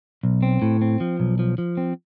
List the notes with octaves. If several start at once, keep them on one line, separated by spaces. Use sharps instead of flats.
B1
C4
A2
C4
F3
B1
F3
F3
C4